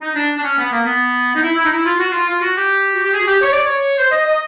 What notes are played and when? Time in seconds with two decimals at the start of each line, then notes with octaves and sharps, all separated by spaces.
0.01 D#4
0.15 D4
0.36 D4
0.43 C#4
0.58 B3
0.72 A#3
0.86 B3
1.35 D#4
1.43 E4
1.57 E4
1.65 D#4
1.71 E4
1.86 F4
1.99 F#4
2.12 F4
2.28 F4
2.42 F#4
2.57 G4
2.94 F#4
3.04 G4
3.13 G#4
3.21 F#4
3.27 G4
3.42 C#5
3.52 D5
3.65 C#5
3.98 C5
4.12 D#5
4.26 D#5